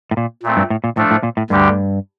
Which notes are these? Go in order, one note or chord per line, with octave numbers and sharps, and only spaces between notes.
A2
A#2
A#2 A3 C4
G2
A2
A#2
A2 F3 A3 D4 A4
A2
A#2
A2
D2 G2 D3 G3 D4 G4